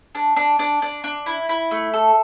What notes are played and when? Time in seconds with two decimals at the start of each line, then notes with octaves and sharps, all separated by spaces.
0.15 D4
0.36 D4
0.59 D4
0.82 D4
1.04 D4
1.26 E4
1.49 E4
1.71 A3
1.94 A4